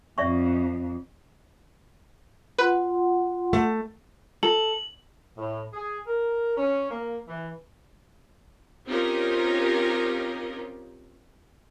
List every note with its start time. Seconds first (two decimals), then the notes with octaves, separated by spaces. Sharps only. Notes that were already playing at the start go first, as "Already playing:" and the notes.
0.18 F2 D5 E5 C#6
2.59 F4 B4 F#5 C6
3.53 A3
4.43 A4 F#7
5.38 A2
5.73 G#4
6.07 A#4
6.57 C#4
6.91 A#3
7.28 E3
8.87 C4 C#4 D#4 F4 G4 A#4